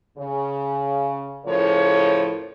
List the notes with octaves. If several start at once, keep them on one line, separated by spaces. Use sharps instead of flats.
C#3
A2 C#3 F3 A#4 C#5